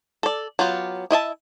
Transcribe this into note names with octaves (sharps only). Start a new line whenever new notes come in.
A4 D5
F#3 B3 F4 G4
E4 D#5 E5 A5